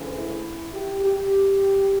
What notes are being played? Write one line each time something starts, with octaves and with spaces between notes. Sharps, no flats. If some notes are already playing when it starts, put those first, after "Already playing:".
Already playing: D2 C#3 E3
E4
G4
G4